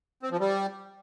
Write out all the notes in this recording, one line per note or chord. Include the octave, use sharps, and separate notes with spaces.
C4
F3
G3